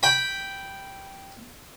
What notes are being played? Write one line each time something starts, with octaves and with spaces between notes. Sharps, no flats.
G5 B5